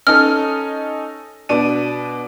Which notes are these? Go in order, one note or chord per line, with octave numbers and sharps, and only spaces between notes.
C#4 D#4 A4 F6
B2 D4 D#7